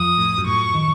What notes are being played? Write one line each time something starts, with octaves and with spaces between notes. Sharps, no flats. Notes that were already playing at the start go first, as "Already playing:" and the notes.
Already playing: F2 F3 D#6
A2
F#2
A2 C#6
D#3